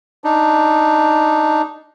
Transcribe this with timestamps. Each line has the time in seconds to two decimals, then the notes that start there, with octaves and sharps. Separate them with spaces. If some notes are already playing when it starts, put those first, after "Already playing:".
0.24 D4 D#4